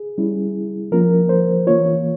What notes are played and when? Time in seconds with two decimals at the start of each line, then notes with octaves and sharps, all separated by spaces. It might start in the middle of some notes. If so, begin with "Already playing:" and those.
Already playing: G#4
0.18 G3 C#4 E4
0.92 F3 A#3 C#4 F4 A#4
1.29 C5
1.67 E3 A#3 F4 C#5